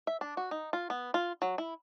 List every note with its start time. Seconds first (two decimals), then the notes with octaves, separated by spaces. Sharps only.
0.07 E5
0.21 D4
0.37 F#4
0.51 D#4
0.73 F4
0.90 B3
1.14 F4
1.42 F#3
1.58 E4